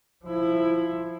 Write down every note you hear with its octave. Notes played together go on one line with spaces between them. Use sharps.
F3 E4